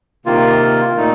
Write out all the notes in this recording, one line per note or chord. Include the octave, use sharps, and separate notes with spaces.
C3 D#3 A#3 F4
A#2 A3 D#4